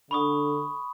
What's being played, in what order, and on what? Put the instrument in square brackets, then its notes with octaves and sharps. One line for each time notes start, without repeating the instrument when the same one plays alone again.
[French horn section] D3 [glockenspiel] B5 C#6 D#6